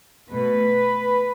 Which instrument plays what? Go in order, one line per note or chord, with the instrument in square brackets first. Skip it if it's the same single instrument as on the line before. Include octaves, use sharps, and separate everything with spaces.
[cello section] B2 A3 B4